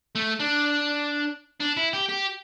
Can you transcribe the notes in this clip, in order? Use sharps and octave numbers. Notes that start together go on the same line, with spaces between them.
A3
D4
D4
E4
G4
G4